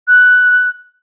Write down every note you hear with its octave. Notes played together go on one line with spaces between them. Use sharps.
F#6